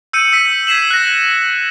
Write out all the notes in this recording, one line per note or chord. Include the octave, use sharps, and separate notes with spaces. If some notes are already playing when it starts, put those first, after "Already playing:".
E6 G6 C#7 D#7
E6 B6 D#7
G#6 B6 C7 E7 F#7
F#6 A#6